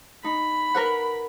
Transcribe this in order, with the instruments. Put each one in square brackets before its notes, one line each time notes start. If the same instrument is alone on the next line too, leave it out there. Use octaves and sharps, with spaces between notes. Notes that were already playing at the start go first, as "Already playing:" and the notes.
[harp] D#4 [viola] B5
[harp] A#4 B4 F#5